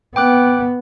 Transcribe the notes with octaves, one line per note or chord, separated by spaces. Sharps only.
B3 G5 D6 F#6